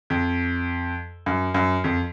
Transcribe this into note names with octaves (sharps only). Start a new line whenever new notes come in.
F2
F#2
F#2
F2